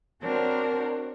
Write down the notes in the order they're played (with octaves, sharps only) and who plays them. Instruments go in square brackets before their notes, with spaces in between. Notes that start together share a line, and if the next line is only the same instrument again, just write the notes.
[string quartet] C4 D4 F#4 A#4 C5 C#5